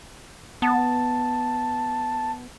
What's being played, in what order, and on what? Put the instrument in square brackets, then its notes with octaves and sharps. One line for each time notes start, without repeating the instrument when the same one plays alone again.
[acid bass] B3 [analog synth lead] A5